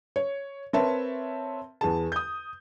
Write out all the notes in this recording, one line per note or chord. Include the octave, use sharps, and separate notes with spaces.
C#5
C4 A#4 B4 C#5 E5 A5
E2 G#4 A5
D#6 G6